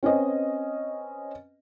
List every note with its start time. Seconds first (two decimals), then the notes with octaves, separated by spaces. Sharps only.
0.03 C4 C#4 B4 D#5